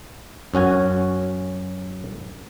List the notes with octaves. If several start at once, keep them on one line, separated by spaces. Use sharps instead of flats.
F#2 C#4 F#4 G#5